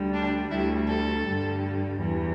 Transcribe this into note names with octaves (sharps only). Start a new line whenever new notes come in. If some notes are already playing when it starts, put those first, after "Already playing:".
Already playing: D2 D3 G3
D4
D2 D3 G3 E4
A4
G2 D3 G3
E2 E3 G3